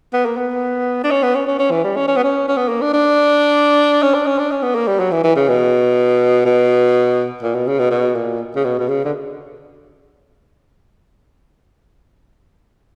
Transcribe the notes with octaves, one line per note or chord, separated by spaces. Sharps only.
B3
A#3
B3
D4
C#4
B3
C#4
C#4
C#4
E3
G3
C#4
C#4
B3
C#4
C#4
B3
A#3
D4
D4
C#4
D4
C#4
D4
C#4
B3
A#3
G3
F#3
E3
E3
C#3
B2
B2
A#2
B2
C#3
B2
B2
A#2
C#3
B2
B2
C#3
D3